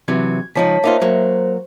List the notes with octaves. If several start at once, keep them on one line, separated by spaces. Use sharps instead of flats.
C3 E3 F#3 G#6
C#2 F3 D#4 C#5 A5 B6
A#3 D#4 F4 C5 E5
F#3 A#3 C5